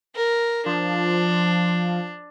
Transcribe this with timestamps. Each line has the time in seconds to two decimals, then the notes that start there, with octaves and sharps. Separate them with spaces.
0.15 A#4
0.66 F3 D4